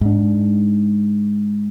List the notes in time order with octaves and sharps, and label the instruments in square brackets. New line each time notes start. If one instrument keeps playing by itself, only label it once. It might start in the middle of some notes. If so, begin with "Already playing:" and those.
[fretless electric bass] G#2 D4